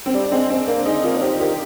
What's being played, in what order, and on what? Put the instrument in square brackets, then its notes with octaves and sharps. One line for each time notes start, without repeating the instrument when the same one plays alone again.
[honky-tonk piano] C4
[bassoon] G3 [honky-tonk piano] D4
[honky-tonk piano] D4
[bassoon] G#3 [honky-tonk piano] C4
[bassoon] G#3 [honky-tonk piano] C4
[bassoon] A#3 [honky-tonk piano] D4
[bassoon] G#3 [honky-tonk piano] D#4
[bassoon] A#3 [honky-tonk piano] F4
[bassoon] D4
[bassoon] C4 [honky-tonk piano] G4
[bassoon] D#3 [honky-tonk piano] G4